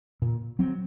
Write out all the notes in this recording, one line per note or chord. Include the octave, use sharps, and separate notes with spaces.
A#2
F#3 C4